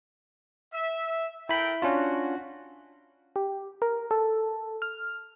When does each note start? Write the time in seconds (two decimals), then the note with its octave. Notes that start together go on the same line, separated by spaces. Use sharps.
0.73 E5
1.49 E4 A4 A#4 G5 B5
1.82 C#4 D4 F4 F#4
3.36 G4
3.82 A#4
4.11 A4
4.82 F6